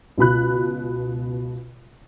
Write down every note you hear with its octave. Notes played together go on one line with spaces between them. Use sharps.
C#2 B2 B5 F#6